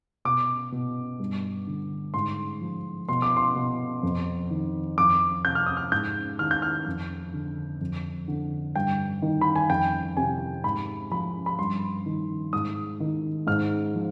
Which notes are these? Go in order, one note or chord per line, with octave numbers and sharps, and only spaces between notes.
B2 D6
B2
G2
D3
G#2 C6
F3
B2 C6
D6
C6
B2
F2
D#3
F2 D6
C3 G6
F6
D#6
F6
G#2 G6
D#3 F6
G6
F6
F2
D3
F2
D3
G2 G5
D#3
B5
G#5
F2 G5
C3 G#5
G#2 B5
F3 B5
B5
G2 C6
D#3
G#2 D#6
D#3
G#2 F6
F3